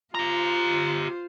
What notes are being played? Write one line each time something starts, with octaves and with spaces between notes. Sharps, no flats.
F4 G4 C5 A#5